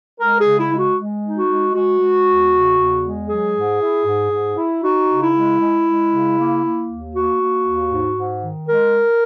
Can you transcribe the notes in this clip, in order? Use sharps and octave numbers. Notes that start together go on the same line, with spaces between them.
G#3 A#4
G#4
C#3
E4
G#3
F#4
G#3
D#4
F#4
G#3
G#3 F#4
G#3
E2
C#3
E2
G#3
F#3 G#4
G#2
E4
G#2
G#2
E4
D#4 F#4
C#3
E4
G#3
G#3
G#3
C#3
A#3
A#3
D#2
A#3 F#4
A#3
D#2
G#2
G#2
D#3
G#3 A#4